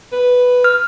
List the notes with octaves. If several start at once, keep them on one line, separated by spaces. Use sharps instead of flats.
B4
F6